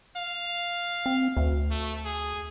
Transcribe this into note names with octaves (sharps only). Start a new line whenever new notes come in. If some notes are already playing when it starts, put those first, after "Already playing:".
F5
C4
D2
A3
G#4